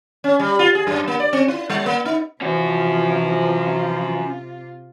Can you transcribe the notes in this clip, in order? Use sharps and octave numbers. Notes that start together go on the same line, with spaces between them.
C#4
G3
F4
G#4
F#2
A#3
D5
C4
E4
G3
A#3
D#4
C3 E3 F3 C#4 F4 F#4